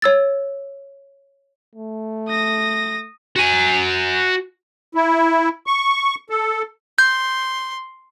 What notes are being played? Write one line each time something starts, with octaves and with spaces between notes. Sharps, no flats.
C#5 E6 A6
A3
D#6 A#6
F#4 G#5
E4
C#6
A4
C6 G6